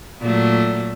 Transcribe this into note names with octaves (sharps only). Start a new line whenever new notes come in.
A#2 F#3 A3